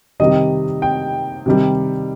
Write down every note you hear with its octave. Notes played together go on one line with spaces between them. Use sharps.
C3 D#3 G3 D#5
G5
C3 D#3 G3